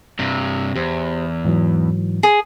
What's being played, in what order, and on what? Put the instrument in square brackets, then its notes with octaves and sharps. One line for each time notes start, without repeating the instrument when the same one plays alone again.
[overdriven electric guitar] G2 C3
[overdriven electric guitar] E2 [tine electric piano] G4 C5
[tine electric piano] G#2 E3 F#3
[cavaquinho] G#4